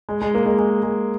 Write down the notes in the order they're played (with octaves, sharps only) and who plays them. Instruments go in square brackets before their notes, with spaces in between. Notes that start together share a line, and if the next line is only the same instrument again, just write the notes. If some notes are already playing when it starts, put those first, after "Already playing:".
[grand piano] G#3
G#3
A#3
G#3
G#3
G#3